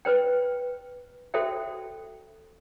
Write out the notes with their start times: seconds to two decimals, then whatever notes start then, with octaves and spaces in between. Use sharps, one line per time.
0.05 B4 C5 G5
1.34 F#4 A4 C5 E5 G5